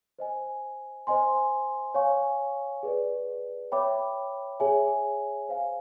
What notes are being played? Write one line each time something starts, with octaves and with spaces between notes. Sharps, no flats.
C5 D#5 G#5
C5 D#5 G#5 C6
C#5 F5 G#5 C#6
G#4 B4 D5
C#5 E5 G5 B5 D6
G#4 C#5 E5 G#5
C5 F5 G#5